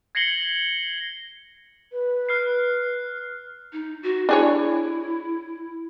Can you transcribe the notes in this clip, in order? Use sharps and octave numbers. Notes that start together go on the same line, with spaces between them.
G#6 A#6 C7 C#7 F#7 G7
B4
F6 F#6 C7
D#4
F#4
D4 E4 G#4 C#5